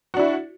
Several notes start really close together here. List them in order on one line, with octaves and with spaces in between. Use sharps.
F#4 D4 E4